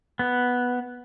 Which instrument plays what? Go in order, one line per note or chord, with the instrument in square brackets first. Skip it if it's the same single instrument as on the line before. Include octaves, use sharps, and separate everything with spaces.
[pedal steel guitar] B3